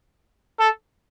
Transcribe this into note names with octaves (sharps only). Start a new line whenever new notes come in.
A4